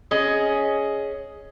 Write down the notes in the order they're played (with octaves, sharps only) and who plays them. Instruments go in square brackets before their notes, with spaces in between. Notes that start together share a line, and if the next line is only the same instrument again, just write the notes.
[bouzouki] C#4 G#4 D#5